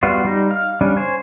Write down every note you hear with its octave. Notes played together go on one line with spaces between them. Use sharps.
G3 B3 F4 F#4
G3 D#4
F5
G3 C#4 D4
C5 C#5 G#5